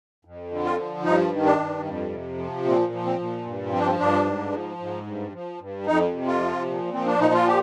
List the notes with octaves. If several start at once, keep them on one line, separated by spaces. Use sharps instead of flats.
F2
D3
F4
F3
G2 D#4
D#3
D4
G2
F2
C3
F3
A#2 C4
F3
C4
A#2
G2
F3 C4
D4
C4
G2 D4
G#2
F3
G#2
G2
F3
G2
F2 D#4
C3
F4
F3
A#2
F3 C4
D4
A#2 D#4
F4
G4